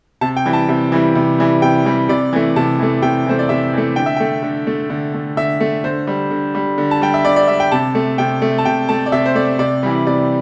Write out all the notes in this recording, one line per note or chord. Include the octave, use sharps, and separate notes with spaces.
C3 A5
G5
E3 G3
A5
C3
E3 G3
C3
E3 G3
C3 G5
E3 G3
C3 D5
E3 A3
C3 A5
E3 A3
C3 G5
E3 A3 C5
D5
C3 E5
E3 A3
D3 G5
E5
A3 G5
D3
A3
D3
A3
D3 E5
A3
D3 C5
G3
D3
G3
D3
A5
G3 G5
E5
D3 D5
D5
G3 E5
G5
C3 A5
A3
C3 G5
A3
A5
C3 G5
A3 A5
D5
C3 E5
C5
A3 D5
C3 D5
E3 G3
C3 D5